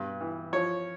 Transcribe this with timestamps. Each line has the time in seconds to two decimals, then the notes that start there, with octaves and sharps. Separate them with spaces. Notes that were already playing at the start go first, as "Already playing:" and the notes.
Already playing: G2 B2
0.21 E3
0.53 F3 C#5